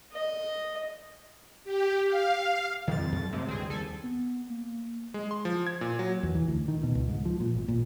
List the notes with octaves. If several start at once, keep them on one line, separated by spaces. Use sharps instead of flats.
D#5
G4
F5
F2 D#3 F#3 A6
F#2 F#3
A2 C3 G#3 A3
C#2 G2 D#3 C4 G#4
D#2 G3 A4 G#5
B3
A#3
G#3
C6
F3
G#6
A#2
F#3
E2
E3
D2
D#3
B2
C#2
G#2
F3
A#2
G#1
A#2